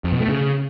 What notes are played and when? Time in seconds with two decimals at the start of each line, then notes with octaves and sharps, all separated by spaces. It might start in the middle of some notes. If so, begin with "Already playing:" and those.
0.04 F2
0.12 B2
0.20 A3
0.28 C#3